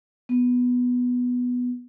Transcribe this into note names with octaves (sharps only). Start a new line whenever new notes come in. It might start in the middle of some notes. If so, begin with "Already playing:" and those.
B3